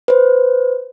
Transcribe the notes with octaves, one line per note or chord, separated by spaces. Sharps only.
B4 C5